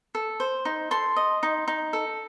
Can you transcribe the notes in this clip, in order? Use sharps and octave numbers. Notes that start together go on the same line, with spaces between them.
A4
C5
D#4
A4 C6
D#5
D#4
D#4
A4